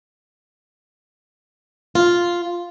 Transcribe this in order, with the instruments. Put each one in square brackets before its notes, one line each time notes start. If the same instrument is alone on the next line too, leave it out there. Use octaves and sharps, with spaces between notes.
[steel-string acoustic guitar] F4